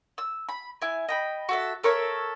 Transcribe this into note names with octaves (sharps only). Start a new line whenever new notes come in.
E6
B5
E4 G#5
D#5 G5 B5
F#4 A4 E5
A4 A#4 C#5 E5